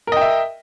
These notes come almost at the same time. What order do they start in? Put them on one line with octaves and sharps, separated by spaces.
A#4 D#5 G5 E5